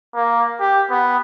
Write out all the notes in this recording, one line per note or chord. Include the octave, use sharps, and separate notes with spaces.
A#3
G4
B3